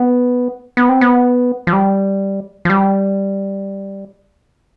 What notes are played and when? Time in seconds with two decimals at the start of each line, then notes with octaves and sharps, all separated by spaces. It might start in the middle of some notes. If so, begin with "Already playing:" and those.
Already playing: B3
0.77 B3
0.89 C4
1.01 B3
1.67 F3
1.73 G3
2.65 F3
2.70 G3